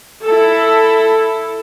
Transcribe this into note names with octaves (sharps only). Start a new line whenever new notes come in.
E4 A4